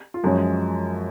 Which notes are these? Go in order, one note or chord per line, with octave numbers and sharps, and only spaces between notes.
F4
F#2 F3 G#3 C#4 F#4